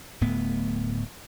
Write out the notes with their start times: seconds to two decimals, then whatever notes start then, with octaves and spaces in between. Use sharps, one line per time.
0.21 D1 A2 B3